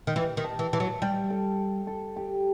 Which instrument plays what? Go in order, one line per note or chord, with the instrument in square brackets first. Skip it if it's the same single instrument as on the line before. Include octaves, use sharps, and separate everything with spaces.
[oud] D#3
[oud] E3 [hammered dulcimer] G5
[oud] D#3
[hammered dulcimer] A5
[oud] E3
[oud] E3 [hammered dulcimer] A5
[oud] F#3
[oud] G3 [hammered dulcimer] G5
[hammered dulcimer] A4
A4
G4